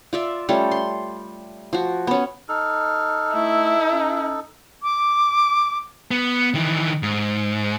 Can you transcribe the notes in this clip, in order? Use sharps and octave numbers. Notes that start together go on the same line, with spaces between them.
F4 D5 E5
G3 A3 C#4 F4
C6
F3 F#4
B3 C#4
D#4 A4 F6
A3 E4
C#4
D6
B3
D#3 E3
G#2